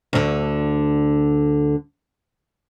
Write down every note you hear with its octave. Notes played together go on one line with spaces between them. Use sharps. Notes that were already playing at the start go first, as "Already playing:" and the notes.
D2 D3